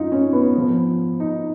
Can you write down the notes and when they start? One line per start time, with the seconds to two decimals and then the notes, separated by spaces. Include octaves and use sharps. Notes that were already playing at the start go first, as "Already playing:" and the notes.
Already playing: F#2 D#4 F4
0.12 C#4
0.33 B3
0.55 G#2 F3
1.20 D#4